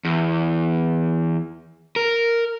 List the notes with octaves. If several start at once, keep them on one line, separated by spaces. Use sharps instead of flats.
E2
A#4